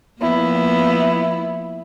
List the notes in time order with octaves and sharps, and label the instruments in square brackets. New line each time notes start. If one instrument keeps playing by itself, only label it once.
[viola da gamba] F3 A#3 B3 [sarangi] E4